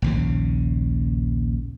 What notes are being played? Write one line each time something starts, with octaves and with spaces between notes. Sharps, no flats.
A#1 D#2 C#3